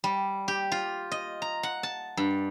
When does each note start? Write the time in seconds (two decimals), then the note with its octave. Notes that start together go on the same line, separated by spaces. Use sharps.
0.04 G3
0.48 G4
0.72 F4
1.12 D#5
1.42 A#5
1.63 F#5
1.83 A5
2.17 G2